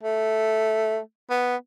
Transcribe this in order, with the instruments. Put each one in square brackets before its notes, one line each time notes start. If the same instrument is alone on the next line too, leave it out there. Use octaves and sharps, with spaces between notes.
[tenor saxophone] A3
B3